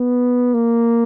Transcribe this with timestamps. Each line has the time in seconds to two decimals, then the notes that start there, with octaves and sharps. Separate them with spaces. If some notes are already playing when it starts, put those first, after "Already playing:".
Already playing: B3
0.54 A#3